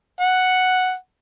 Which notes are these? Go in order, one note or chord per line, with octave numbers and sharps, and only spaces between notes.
F#5